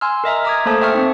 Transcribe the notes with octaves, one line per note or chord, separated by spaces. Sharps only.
G#5 C6 E6 F6
A#4 D#5 E5 A#5
A#5 D6 D#6 G#6
A3 A#3 A4 C5 A5
E5 G5 A5 C#6 F6
C4 D#4